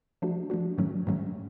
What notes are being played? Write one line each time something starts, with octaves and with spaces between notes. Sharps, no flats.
F3 A3 D4 F#4
F3 A3 D4 F#4
G#2 D#3 F#3 A3 C#4
G#2 D#3 F#3 A3 C#4